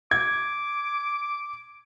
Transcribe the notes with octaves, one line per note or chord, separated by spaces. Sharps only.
D6 G#6